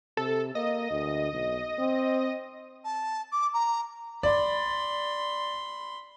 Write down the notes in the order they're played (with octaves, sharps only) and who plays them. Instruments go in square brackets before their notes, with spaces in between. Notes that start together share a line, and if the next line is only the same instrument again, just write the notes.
[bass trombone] C3 [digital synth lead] A4
[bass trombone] A#3 [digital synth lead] D#5
[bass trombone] D2
B1
C4
[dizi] A5
D6
A#5
[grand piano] D5 [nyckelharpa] B5 C6